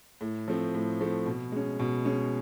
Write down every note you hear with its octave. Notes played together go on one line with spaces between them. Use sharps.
A2
F3 A3 C4
A2
F3 A3 C4
B2
G#3 C#4
B2
G#3 C#4